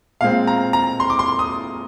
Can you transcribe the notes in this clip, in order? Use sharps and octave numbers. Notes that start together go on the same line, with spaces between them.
A#2 G#3 C4 F5
A#5
A#5
C6
D6
C6
D#6